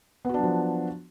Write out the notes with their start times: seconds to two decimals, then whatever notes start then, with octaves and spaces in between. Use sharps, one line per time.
0.25 B3
0.29 F#4
0.34 D4
0.39 F#3
0.43 F3